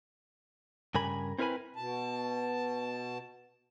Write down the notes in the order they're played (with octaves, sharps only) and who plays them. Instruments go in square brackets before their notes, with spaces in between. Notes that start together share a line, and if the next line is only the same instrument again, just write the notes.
[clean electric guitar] G2 C#3 A#4 G#5 B5
C4 E4 A#4 B4 G#5 B5
[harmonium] B2 A5